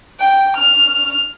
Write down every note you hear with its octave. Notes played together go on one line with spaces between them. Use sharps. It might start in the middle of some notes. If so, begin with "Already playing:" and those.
G5
F6